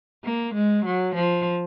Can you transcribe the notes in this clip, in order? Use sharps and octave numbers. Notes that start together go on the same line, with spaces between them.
A#3
G#3
F#3
F3